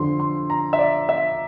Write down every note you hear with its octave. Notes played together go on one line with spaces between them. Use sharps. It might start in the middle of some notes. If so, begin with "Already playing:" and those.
Already playing: F2 D3 F3 C6
C6
A#5
E5
D5
E5